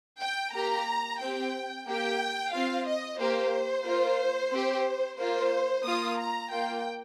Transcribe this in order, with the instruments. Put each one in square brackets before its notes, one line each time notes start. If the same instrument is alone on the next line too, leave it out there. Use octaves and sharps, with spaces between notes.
[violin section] G5
A#3 G4 A#5
C4 G4 G5
A#3 G4 G5
C4 F4 F5
D#5
A#3 G4 C5
A#3 F4
C4 G4
A#3 F4 C5
A#3 F4 D#6
A#5
A#3 F4 G5